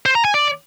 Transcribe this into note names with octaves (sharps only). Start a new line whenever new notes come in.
C5
A#5
G#5
D5